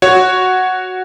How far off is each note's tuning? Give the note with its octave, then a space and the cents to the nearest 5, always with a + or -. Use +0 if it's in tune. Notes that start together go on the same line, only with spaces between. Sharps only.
F#4 +0 C#5 +0